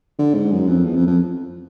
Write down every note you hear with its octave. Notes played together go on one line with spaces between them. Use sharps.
D3
G#2
F#2
F2
E2
F2
F2